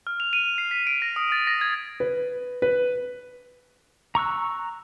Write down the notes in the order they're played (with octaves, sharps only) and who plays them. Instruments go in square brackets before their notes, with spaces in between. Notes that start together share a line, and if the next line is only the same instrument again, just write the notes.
[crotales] F6
F7
D#7
C7
B6
D7
A#6
D#6
A6
A#6
G#6
[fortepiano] B4
B4
[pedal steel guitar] A#5 C#6 E6 F#6